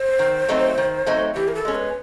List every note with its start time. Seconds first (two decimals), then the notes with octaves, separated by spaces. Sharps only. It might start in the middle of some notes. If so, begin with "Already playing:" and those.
Already playing: C5
0.19 D#3
0.49 F#3 A3 C4 D#4
0.78 D#3
1.06 F#3 A3 C4 D#4
1.35 E3 G4
1.48 A#4
1.55 A4
1.65 G#3 C#4
1.75 B4